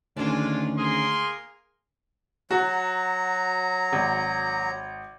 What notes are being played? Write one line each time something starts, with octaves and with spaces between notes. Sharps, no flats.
D2 D#3 G#3 C#4 D4 F4
A#3 G#4 A#4 C6
F#3 F#4 A#5
G#1